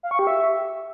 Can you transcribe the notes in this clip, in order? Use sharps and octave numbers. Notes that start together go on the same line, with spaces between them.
F5
C#6
G4
E5